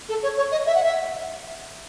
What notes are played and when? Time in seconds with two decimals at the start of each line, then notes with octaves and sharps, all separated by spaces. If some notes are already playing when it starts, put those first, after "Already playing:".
0.08 A4
0.22 C#5
0.36 C#5
0.51 D#5
0.66 E5
0.74 F#5
0.83 E5